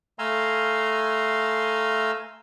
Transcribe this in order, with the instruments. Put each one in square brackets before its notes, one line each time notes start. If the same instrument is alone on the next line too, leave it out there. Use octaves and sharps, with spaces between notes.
[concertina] A3 F5 G#5 A#5 C6 E6